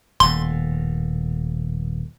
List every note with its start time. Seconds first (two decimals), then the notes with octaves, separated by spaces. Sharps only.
0.20 D#1 A2 C6